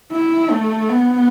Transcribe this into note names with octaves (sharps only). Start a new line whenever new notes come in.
E4
A3
B3